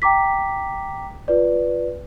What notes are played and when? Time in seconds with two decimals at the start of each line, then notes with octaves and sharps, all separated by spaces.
0.02 G5 A#5 D6 B6
1.28 F4 B4 D5